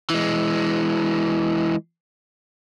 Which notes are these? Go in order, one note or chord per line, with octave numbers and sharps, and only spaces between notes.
E3 G#3